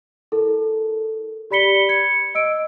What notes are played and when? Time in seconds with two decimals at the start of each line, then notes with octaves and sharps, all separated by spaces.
0.32 E4 A4 A#4
1.51 G4 D5 B5 B6 C#7 G7
1.89 G#6 C#7
2.35 D#5 E6 D7